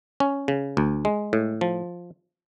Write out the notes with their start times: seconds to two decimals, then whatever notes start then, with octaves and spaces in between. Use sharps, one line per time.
0.20 C#4
0.48 C#3
0.77 D2
1.05 G#3
1.33 A2
1.61 F3